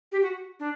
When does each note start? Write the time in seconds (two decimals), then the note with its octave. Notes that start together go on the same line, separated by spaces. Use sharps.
0.12 G4
0.22 F#4
0.60 D4